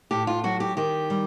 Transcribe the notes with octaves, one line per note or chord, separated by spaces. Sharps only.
A2 G4
F4
F#3 F#4
G4
D#3 G4
G3